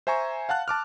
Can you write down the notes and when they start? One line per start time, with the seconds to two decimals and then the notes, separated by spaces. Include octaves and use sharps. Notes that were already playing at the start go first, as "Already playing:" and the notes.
0.07 C5 E5 G#5 A#5 C#6
0.49 F5 F#5 A5 F#6
0.68 A5 D6 F6